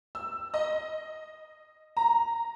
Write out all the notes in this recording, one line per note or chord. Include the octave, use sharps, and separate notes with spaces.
E6
D#5
A#5